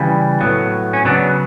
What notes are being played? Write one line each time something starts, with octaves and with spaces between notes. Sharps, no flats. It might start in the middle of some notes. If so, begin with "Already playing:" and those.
Already playing: C#3 E3 G3
A2 F#3 B3
C#4
C#3 F#3 B3 D4